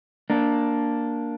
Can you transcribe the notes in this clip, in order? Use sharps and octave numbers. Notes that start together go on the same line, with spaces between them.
A#3 D4